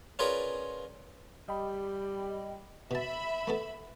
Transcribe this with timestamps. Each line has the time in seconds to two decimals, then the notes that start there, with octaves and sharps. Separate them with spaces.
0.19 C#4 F4 G#4 A#4 B4 D5
1.48 G3 G4 D#5 G5 B5
2.91 B2 E5 A5 B5
3.47 A3 B3 A4